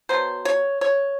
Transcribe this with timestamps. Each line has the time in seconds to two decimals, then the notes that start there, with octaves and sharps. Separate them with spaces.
0.09 B2 F#3 B3 C5
0.45 C#5
0.81 C#5